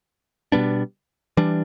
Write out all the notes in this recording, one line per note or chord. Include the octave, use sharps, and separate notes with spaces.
B2 G3 B3 D4
E3 G3 D4